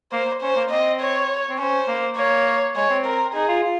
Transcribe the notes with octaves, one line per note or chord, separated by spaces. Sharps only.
A#3 C5
C#4 C5
A#3
C4 D#5
C#5
C4
C#4 C5
A#3
A#3 C#5
G#3 C#5
C4
A#4
D#4 G#4
F4
F4